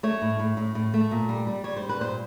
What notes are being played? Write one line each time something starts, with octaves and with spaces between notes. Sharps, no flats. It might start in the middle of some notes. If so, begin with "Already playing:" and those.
A3 C#5
A2
A2
A2
A2
A3
A#2
G3
G3
G3 C#5
C5
G3
B4
A#2 C5